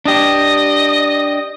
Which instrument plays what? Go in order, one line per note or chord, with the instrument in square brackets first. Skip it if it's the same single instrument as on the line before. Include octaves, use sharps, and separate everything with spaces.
[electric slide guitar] D4 G4 [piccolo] D#5